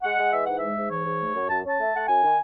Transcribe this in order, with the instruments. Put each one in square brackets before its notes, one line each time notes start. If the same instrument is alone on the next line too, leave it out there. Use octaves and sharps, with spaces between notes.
[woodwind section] G#3 F#5
G#3
E3 E5
G#2 F#5
G#3 E5
G#2
E3 C#5
G#2
A3
F#2
F#2 A5
C#4 A5
A3 E5
A3 F#5
F#2 G#5
D#3